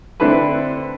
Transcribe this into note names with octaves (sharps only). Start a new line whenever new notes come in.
D3 C4 D4 E4 A4 B4